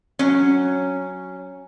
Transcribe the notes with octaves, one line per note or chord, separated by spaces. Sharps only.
F#3 C#4